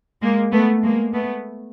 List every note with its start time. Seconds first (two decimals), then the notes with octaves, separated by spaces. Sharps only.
0.22 G#3 A#3
0.52 A3 B3
0.83 G#3 A#3
1.12 A3 B3